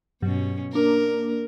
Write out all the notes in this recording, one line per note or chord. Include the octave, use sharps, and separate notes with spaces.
G2 B2 F#3 C#4
A#3 D4 A#4